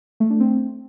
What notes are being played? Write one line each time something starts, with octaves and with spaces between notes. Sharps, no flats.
A3
D4
C4